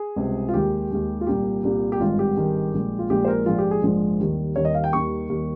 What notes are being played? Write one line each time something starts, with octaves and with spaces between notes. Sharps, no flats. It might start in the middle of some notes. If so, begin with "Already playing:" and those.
Already playing: G#4
C#2 C3 G3
F4
D#2 D#3 G#3 G4
D#2 D#3 G#3
F4
C2 A#2 G3 G4
C2 A#2 G3
G4
G#1 G2 D#3 G#3 F4
G4
G#1 G2 D#3 G#3
A#1 A#2 G#3
F4
A#1 A#2 G#3 G4
C5
A#4
A#1 G#2 F3 G#3 F4
G4
G#4
A#1 G#2 F3 G#3
D#2 D#3 G3
D#2 D#3 G3 C#5
D#5
F5
G5
D#2 D#3 G3 C#6
D#2 D#3 G3